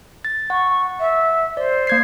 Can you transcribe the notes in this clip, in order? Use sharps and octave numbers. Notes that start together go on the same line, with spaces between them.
A6
F#5 C#6
E5
C5 D5
A#3 G#6 C7